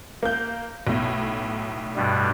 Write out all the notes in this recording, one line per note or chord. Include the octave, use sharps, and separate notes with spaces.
A#3 G6
B1 A2
G2 B2 G3